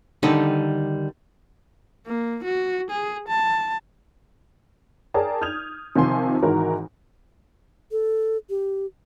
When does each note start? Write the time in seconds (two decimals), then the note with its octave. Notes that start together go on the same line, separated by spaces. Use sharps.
0.23 D3 D#3 G3 D#4 A4
2.06 A#3
2.44 F#4
2.90 G#4
3.28 A5
5.14 G#4 A#4 D5 G5 A5
5.41 D#6 F6 G6 G#6 F7
5.96 C3 D#3 F3 G#5 C6
6.43 G#1 G#2 E3 F#4 A#4
7.92 A4
8.50 G4